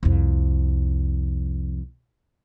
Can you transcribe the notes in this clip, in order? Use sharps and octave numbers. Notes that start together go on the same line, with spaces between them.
C2 F2